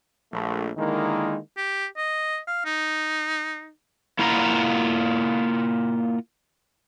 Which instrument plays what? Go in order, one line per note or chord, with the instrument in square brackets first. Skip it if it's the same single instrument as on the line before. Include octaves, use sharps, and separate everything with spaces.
[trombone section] A#1 A3
D3 D#3 G#3 A#3 D#4 E4
[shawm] G4
D#5
F5
D#4
[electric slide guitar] A#3 E4 F4 F#5 A#5